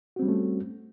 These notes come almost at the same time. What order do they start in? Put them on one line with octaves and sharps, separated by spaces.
F#4 C4 G3 C#4 A3